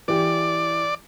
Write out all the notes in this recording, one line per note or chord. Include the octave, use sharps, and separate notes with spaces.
E3 G4 D5